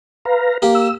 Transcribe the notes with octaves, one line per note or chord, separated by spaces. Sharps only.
B4 F5 A#5
A#3 G4
E6